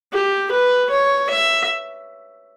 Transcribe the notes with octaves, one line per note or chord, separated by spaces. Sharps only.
G4
B4
C#5
E5